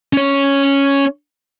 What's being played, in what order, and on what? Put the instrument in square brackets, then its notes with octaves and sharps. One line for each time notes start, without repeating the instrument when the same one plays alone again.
[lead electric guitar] C#4 C#5